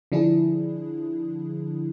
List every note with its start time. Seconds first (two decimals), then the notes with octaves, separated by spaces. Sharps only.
0.12 D3 F3 D4 E4 G#4